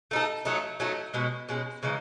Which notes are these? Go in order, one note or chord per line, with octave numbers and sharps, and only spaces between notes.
A3 D#4 A4
F#3 A3 D#4
F#3 A3 D#4
B2 G#3 C#4
B2 G#3 C#4
C#3 E3 G#3 D#4